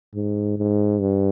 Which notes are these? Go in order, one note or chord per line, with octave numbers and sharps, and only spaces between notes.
G#2
G#2
G2